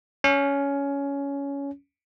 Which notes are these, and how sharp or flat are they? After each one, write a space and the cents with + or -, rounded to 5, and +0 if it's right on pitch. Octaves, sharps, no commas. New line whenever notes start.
C#4 +15